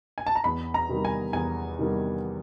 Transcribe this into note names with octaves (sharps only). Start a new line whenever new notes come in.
G#5
A5
A#5
E2 B5
A#5
C3 D#3 G3
G#5
E2 G#5
C3 D#3 G3